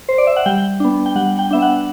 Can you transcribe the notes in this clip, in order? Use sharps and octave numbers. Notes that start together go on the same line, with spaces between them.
C5
D5
E5
F#5
G3 G5
B3 D4
G5
G3 F#5
G5
B3 D4 E5
F#5